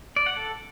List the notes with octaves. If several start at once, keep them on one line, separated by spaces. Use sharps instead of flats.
D5
F#5
A4